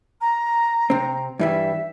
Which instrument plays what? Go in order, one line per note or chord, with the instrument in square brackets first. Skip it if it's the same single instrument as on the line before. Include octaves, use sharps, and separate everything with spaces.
[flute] A#5
[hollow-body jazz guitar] C3 C4
[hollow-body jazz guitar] G2 E3 G3 [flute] E5